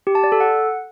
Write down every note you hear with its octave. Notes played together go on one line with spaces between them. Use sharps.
G4
A5
D5
A4
F#5